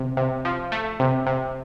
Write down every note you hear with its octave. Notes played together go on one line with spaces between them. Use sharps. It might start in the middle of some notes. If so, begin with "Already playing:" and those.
Already playing: C3
C3
F3
A3
C3
C3